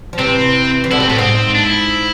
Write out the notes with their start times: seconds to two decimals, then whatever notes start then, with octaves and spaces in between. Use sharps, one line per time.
0.13 F3
0.18 C3 E3 C4
0.84 E3
0.91 B2 D3 E4
1.00 C3 C4
1.09 A2 B3
1.18 G#2 C4
1.55 D4
1.63 E4